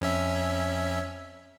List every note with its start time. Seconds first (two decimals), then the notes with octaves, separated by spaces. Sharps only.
0.01 F2 C#4 E5